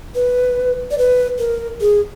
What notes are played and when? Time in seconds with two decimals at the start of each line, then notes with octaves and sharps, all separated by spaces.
0.15 B4
0.91 D5
0.98 B4
1.39 A#4
1.81 G#4